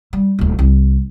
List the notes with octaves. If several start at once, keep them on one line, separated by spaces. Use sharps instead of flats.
G3
D#1 D2
C2